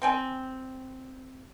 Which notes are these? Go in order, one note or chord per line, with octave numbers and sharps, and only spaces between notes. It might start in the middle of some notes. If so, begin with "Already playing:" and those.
C4 G5 G#5